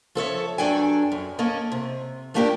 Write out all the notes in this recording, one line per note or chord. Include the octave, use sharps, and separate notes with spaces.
F3 A4 C#5 E5
G2 F#3 D4 A4 G5 G#5
F#2
A#3 C#4 A4 D#5
C3
F3 A3 A#3 D4 G4 A#4